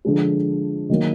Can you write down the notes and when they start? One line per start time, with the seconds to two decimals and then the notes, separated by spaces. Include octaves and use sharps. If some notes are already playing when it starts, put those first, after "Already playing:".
0.05 D3 F3 G#3
0.90 D#3 F#3 A#3